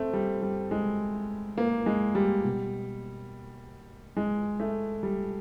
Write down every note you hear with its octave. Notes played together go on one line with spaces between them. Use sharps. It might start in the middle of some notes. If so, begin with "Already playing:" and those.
Already playing: A3 C4
G3
G3
G#3
A#3
G#3
G3
B2
G#3
A3
G3